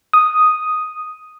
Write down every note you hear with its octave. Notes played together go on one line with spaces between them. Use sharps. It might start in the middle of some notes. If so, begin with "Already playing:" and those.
D#6